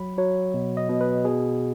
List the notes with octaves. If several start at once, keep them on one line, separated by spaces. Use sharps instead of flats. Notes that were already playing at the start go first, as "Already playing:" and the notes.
Already playing: F#3 B5
F#3 C#5
B2
D#5
B2
B4
B2 G#4